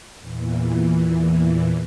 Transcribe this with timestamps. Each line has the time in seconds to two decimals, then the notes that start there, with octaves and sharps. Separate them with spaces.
0.19 E2 A#2 E3